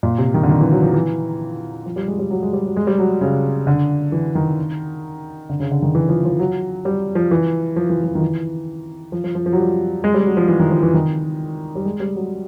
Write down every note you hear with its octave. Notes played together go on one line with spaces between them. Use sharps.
A#2
C3
D#3
D3
D#3
E3
F#3
F3
E3
F3
G3
G#3
G3
F#3
G#3
G3
F#3
G#3
G3
F#3
C#3
D3
E3
D#3
D3
C#3
D3
D#3
E3
F3
F3
F#3
G3
F3
E3
F3
E3
F3
D#3
E3
F3
F3
F3
F3
F#3
G3
G#3
G3
F#3
F3
E3
D#3
F3
E3
D#3
G3
G#3
G3
F#3